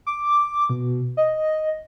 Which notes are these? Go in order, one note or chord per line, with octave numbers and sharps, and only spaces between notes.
D6
B2
D#5